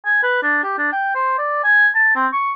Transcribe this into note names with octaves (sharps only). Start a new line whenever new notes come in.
G#5
B4
D4
G4
D4
G5
C5
D5
G#5
A5
C4
C#6